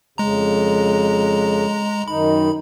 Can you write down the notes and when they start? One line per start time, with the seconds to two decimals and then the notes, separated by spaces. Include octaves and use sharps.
0.18 F2 C#3 G#3 A#5
2.08 F#2 D#3 D#4 B5